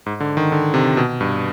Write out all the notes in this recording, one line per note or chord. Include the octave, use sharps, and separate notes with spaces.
G#2
D3
D#3
D3
C3
B2
G2